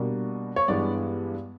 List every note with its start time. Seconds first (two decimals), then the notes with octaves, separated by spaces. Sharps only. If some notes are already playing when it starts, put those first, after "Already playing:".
Already playing: B2 G3 A#3 D4
0.56 C#5
0.68 G2 E3 G#3 B3 D4 D5